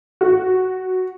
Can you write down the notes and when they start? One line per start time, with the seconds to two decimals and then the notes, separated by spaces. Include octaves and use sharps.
0.21 F#4